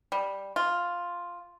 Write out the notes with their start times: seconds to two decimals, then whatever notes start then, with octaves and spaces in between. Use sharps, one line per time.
0.12 G3
0.56 F4